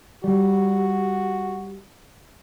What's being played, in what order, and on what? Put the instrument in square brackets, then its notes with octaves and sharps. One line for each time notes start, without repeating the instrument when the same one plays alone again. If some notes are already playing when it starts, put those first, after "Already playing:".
[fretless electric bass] G3 [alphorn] F#4